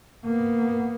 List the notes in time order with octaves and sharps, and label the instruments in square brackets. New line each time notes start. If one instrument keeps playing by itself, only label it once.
[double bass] A#3 B3